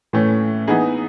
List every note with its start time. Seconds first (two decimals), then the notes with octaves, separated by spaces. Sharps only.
0.13 A2 E3 A3 C#4
0.68 E3 B3 D#4 G#4